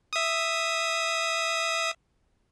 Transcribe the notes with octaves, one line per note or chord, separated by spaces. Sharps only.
E5 D#6